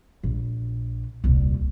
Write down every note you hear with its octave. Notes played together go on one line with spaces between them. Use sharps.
A#1
D#1 C2